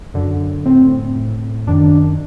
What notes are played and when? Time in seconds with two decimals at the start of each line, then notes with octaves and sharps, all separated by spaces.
0.14 F#2 D3
0.65 A2 C4
1.16 A2
1.67 F#2 D#3 D4